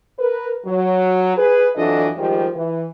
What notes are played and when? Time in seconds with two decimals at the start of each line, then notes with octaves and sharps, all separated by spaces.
0.19 A#4 B4
0.66 F#3
1.37 G#4 B4
1.76 F2 E3 F#3 D4 A4 D#5
2.16 D#3 F3 G3 G#3 G4
2.55 E3